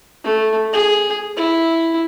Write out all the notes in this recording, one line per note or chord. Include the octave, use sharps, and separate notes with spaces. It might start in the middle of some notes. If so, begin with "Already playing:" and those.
A3
G#4
E4